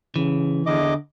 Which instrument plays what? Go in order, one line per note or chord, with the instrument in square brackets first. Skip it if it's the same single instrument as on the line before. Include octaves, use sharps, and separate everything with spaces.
[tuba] C#3 [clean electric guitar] E3
[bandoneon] E2 D#5 D6 [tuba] D3